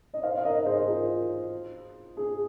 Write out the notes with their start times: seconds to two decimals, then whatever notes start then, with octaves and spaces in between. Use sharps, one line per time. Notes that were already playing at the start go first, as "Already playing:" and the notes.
0.14 D#5
0.23 C5 F5
0.37 F5
0.45 A#4 D#5
0.59 D#5
0.66 G#4 C5
0.88 F4 A#4
2.17 G#4